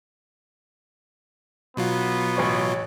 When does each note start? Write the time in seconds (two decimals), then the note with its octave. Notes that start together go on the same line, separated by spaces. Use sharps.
1.77 B2 F#3 B3 F4
2.37 A1 C#5 C#6